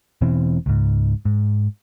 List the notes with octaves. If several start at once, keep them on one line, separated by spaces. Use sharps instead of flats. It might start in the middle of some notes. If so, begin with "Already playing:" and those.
E1 B2 E3 C4
C#2 G#2
G#2